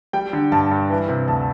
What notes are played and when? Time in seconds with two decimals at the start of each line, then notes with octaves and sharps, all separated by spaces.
0.13 G3 G5
0.33 D3
0.52 G2 A5
0.71 G2
0.90 E3
1.09 C3
1.28 D2 A5